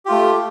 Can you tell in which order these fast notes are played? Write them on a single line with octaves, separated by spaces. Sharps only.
G4 F4 A3